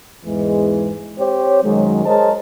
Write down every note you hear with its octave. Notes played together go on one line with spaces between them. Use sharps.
E2 G#2 E3 G#3
C4 G4 C5 C#5
F#2 D#3 F#3 G#3
G#4 A#4 C5 C#5 D#5 A5